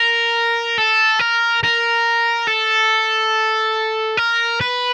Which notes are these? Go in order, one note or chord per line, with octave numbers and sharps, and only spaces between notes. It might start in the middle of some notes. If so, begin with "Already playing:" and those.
Already playing: A#4
A4
A#4
A#4
A4
A#4
B4